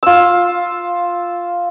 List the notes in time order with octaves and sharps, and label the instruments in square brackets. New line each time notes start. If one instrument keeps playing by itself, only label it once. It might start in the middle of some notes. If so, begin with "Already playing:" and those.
[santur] F4 E6